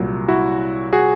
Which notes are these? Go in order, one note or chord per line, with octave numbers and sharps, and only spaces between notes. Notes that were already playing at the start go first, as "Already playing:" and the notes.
Already playing: C2 A#2 F#3
E4 F#4
F#4 G#4